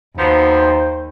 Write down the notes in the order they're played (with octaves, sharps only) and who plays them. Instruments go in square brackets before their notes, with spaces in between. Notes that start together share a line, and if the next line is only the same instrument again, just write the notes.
[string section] D#2 [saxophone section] F3 F#3 B3 [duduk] C5